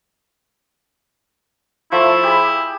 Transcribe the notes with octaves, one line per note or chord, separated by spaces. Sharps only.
F3 A3 E4
G4 G#4 B5